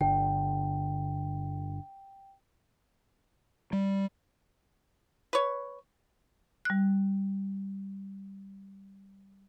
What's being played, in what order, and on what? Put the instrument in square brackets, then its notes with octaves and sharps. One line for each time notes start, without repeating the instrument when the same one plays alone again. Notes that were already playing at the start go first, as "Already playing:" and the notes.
[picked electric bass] G1 D3 [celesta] G5
[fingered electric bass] G3
[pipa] B4 C#5
[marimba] G3 F#6